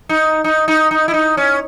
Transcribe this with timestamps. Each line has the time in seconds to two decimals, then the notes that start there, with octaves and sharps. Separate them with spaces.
0.09 D#4
0.44 D#4
0.68 D#4
0.91 D#4
1.08 E4
1.14 D#4
1.37 C#4